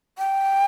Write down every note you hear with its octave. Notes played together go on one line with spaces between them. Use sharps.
G5